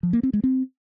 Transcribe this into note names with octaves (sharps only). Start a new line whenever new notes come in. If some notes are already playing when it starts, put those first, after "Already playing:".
F3
A#3
C4
G#3
C4